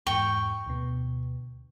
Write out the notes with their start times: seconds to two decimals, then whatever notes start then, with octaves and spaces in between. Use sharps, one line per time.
0.07 E2 G#2 G5 C#6
0.66 D2 B2